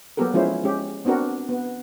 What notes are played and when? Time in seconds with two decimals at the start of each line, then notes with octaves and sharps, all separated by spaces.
0.17 F#3 A#3 B3 G4 A4 A#4
0.34 F3 G#3 C#4 E4 C5
0.64 G#3 C#4 G4
1.05 B3 C4 D4 F#4 A#4
1.49 B3